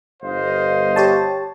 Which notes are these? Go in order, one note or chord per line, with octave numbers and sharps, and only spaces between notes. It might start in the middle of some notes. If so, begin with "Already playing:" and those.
G1 C5 D#5 F5
G4 C#5 A5